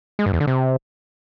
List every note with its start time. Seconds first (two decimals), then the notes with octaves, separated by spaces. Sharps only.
0.19 G#3
0.26 G2
0.33 E2
0.40 D3
0.47 C3